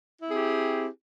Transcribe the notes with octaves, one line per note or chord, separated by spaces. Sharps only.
C4 E4 G4 G#4